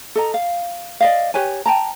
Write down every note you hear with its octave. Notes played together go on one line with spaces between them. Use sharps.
A4 D#5 A#5
F5
D5 D#5 F5
G4 B4 C#5 G#5
G5 A5 A#5